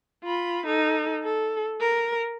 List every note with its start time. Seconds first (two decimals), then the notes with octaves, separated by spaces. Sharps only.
0.24 F4 B5
0.66 D#4 A4
1.23 A4
1.81 A#4